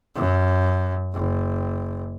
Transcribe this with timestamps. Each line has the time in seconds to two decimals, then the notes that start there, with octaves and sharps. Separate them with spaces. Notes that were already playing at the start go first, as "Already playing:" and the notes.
0.15 F#2
1.14 F#1